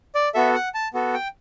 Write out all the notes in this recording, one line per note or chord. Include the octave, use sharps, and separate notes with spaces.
D5
B3 F#4 A4 E5
F#5
A5
B3 F#4 A4
G5